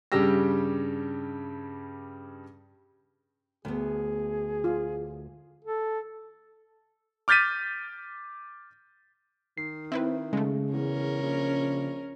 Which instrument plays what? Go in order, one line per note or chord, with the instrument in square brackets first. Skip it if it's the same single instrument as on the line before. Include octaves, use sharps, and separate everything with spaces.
[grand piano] G2 C#3 G3 G4 E6 A#6
[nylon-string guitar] D2 A3 B3 [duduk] G#4
[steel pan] F4
[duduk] A4
[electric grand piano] D6 F6 G6 A6 B6 D#7
[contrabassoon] D#3 [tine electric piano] C7
[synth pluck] C4 E4 B4 [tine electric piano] E5
[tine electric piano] C#3 [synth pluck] G#3 A3
[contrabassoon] E2 [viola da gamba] C#4 A#4
[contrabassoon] A#1